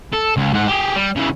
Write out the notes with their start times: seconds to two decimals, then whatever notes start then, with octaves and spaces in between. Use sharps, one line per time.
0.13 A4
0.37 C#2
0.53 G#2 F#5
0.68 G4 G#4
0.96 G3
1.16 C#3 E3